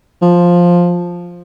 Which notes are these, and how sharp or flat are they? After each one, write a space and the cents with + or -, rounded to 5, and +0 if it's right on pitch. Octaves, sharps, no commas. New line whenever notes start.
F3 +5